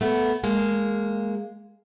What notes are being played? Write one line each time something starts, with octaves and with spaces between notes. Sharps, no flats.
A3 B3
G#3 A#3